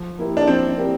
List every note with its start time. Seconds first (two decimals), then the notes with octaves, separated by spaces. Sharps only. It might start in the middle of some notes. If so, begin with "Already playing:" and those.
Already playing: F3
0.19 A#3 E4 G4 A#4
0.37 D4
0.47 F3 C4
0.77 A#3 E4 G4 A#4